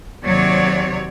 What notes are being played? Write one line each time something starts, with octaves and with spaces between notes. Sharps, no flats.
D#2 C3 F#3 C#5 D5